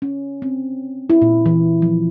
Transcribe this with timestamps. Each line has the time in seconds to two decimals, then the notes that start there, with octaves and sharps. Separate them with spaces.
0.02 C#4
0.42 C4
1.10 E4
1.22 A#2
1.46 E3
1.82 F3